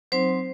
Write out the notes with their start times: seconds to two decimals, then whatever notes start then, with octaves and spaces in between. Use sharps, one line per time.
0.12 F#3 C4 D#4 C5